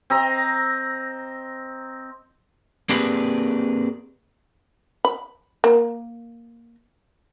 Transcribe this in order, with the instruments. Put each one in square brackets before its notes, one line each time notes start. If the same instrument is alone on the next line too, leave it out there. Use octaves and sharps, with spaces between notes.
[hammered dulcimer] C4 D#5 A#5
[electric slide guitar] A#3 C4 D4 G4 G#4 B4
[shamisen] B5
A#3